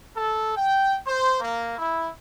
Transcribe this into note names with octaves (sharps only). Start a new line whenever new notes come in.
A4
G5
C5
A#3
E4